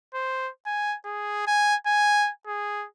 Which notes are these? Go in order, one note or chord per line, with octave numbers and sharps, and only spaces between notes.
C5
G#5
G#4
G#5
G#5
G#4